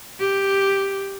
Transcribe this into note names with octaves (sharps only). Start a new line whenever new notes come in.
G4